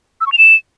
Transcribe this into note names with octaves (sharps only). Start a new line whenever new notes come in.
E6
C#6
F7
E7